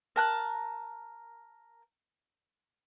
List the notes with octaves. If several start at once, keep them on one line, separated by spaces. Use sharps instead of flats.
A#4 A5 F#6